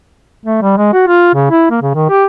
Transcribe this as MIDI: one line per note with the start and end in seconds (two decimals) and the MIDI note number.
0.46 0.61 57
0.62 0.73 55
0.77 0.90 56
0.93 1.04 66
1.07 1.31 65
1.35 1.47 49
1.51 1.66 64
1.71 1.80 58
1.82 1.93 49
1.95 2.09 51
2.10 2.25 67